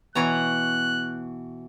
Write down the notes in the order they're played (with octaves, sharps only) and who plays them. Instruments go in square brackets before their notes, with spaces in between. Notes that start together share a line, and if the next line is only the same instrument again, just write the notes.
[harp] B2 [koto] E3 C#5 A#5 [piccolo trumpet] F#6